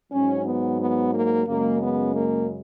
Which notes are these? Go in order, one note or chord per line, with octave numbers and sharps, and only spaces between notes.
G#2 F#3 C#4
B3
B3
A#3
F#2 C#3 G#3 A#3
B3
A#3